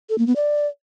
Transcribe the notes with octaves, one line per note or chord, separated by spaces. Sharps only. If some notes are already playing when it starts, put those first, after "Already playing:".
A4
A#3
B3
D5